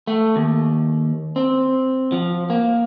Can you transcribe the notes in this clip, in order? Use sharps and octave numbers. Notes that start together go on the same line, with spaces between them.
A3
D#2
C4
F3
A#3